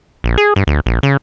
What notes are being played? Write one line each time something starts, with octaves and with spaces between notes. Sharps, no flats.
A#1
G#4
G2
D2
A#1
C#3